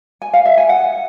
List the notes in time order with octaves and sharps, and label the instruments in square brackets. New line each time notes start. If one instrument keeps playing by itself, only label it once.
[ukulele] G#5
F5
E5
G#5
F#5